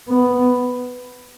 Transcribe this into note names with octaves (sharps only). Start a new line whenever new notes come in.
B3